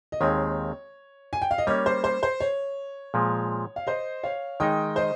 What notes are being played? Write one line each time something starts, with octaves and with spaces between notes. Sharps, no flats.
D#5
D#2 D#3 G#3 C4 C#5
G#5
G5
F5
D#5
G3 A#3 C#4 C#5
C5
C5
C5
C#5
A#2 F3 G#3
F5
C5 D#5
C#5 F5
D#3 G#3 D#4 D#5 G5
C5 D#5